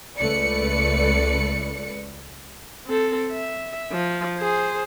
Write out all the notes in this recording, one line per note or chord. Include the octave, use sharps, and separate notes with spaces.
C#2 A3 B4 D5 C#7
C4 A4
E5
F3
G#4 C5